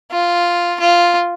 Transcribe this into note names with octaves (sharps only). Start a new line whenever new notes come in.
F4
F4